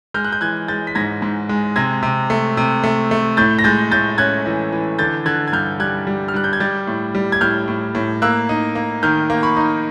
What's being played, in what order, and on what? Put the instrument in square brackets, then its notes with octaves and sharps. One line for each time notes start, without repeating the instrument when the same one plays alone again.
[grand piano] G#3 F6 G6
F#6
G6
E3 F#6 G#6
G#3 G6 A6
B6
G#2 G#6 A#6
G#2
G#3
C3 G#6 A#6
C3
A3
C3
A3
A3
A2 G6 A6
A#6
G#3 G6 A6
A2 G6 A6
C#4 F#6 G#6
E3
E3
D3 G6 A6
D3 F#6 G#6
G#6
G2 F6 G6
G3 F#6 G#6
G3
F6
G3 F#6
G6
G#6
G3 G6 A6
A2
G3
G#6
A2 F6 G6
A2
A2
A#3 E6 F#6
D#4
A#3
D#3 F6 G6
A#3
B5 C#6
D#4